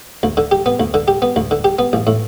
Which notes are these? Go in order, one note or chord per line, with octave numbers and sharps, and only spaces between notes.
D2
D3
G4
B3
D2
D3
G4
B3
D2
D3
G4
B3
A1
A2